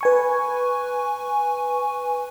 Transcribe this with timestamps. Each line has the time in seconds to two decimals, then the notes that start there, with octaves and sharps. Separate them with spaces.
0.01 B4 G#5 C#6